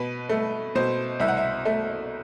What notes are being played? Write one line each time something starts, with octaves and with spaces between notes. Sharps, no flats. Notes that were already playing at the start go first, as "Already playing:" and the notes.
Already playing: B2 B4
A3
B2 C5
C2 E5
F#5
E5
A3 E5